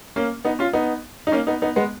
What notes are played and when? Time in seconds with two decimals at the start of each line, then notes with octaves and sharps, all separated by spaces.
0.16 A#3 C#4
0.45 B3 D#4
0.59 C#4 F4
0.73 B3 D#4
1.27 D#4
1.32 A#3 C#4
1.47 B3 D#4
1.62 B3 D#4
1.76 G#3 B3